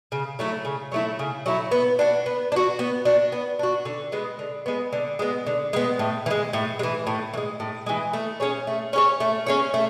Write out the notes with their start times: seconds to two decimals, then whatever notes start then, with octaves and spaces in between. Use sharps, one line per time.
0.12 C#3
0.39 F#3 A3 E4
0.65 C#3
0.92 F#3 A3 E4
1.19 C#3
1.46 F#3 A3 E4
1.72 B3
1.99 D4 F#4
2.26 B3
2.52 D4
2.56 F#4
2.79 B3
3.05 D4 F#4
3.32 B3
3.59 D4 F#4
3.85 D3
4.12 G#3 B3
4.39 D3
4.66 G#3 B3
4.93 D3
5.19 G#3 B3
5.47 D3
5.73 G#3 B3
5.99 A2
6.26 E3
6.31 G#3
6.53 A2
6.79 G#3
6.83 E3
7.07 A2
7.34 E3
7.37 G#3
7.60 A2
7.86 E3 G#3
8.13 A3
8.40 C#4 G#4 C#5
8.67 A3
8.93 C#4 G#4 C#5
9.20 A3
9.46 C#4 G#4 C#5
9.74 A3